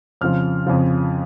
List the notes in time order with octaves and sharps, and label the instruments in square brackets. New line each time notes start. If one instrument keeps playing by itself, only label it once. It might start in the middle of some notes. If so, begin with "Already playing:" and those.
[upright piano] F2 C#3 F3 F6
F2 C#3 F3